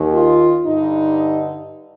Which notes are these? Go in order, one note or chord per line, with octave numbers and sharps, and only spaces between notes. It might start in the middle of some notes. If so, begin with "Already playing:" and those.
Already playing: D#2 D#3
F4
G2 D3 D#4